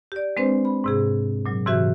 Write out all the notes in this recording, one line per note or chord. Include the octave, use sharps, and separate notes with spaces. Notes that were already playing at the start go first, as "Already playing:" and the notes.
G4 D5
G#3 C4 D4 B4 C5
B5
G#2 C3 G#4
A#2 F#3
G#2 C3 E3 F#4 G4 E5